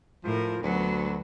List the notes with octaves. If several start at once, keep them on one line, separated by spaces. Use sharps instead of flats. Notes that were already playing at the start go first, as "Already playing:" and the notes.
A2 F3 A#4
D2 F#3 B3